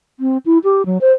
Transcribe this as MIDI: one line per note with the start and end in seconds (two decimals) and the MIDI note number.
0.20 0.38 60
0.46 0.58 64
0.64 0.85 67
0.86 0.98 54
1.01 1.12 72